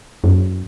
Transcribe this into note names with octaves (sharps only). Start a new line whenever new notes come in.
F#2